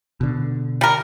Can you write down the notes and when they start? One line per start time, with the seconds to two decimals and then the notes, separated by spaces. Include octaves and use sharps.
0.21 B2 D3
0.81 G3 A#4